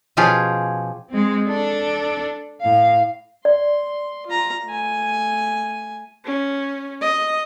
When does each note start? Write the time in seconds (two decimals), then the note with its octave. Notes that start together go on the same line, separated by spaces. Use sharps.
0.17 B2 F3 C#4 F4 G4 G#4
1.10 G#3 C4
1.48 D4 A4
2.61 A2 F5
3.45 D5 C6
4.26 F4 A#5
4.66 A3 G#5
6.25 C#4
7.01 D#5